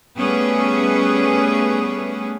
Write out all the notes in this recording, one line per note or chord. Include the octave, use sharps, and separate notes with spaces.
G3 A3 B3 C#4 G#4 B4